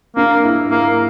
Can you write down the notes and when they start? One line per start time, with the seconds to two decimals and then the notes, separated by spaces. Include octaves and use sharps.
0.16 A#3 D4
0.44 E4
0.71 A#3 E4